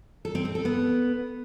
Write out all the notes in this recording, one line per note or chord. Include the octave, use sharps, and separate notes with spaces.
A4
C4
C4
A4
B3